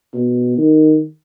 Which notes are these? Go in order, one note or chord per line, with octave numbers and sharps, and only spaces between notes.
B2
D#3